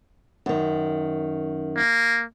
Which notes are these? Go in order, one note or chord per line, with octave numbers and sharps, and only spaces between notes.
F#2 D#3
A#3